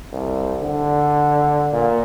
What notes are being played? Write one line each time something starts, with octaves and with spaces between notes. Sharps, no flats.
C2
D3
A#2